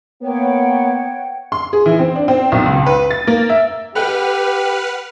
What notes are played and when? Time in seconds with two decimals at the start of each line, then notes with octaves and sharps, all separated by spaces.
0.22 A#3 B3 C#5 F#5 G5
1.52 C6
1.73 G#4
1.86 E3
1.99 C4
2.16 D4
2.28 C4
2.52 B1
2.66 C#2
2.86 B4
3.11 A6
3.27 A#3
3.50 E5
3.95 G4 A4 B4 F#5 G5 F6 F#6